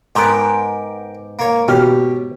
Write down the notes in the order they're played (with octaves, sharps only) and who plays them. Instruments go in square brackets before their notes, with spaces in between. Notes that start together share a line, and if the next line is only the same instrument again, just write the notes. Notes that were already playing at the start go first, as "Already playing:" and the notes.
[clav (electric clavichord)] G#2 B3 [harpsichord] G4 A#4 G5
[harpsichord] A#3 C#5
[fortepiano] B2 G4 F6 [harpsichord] C#4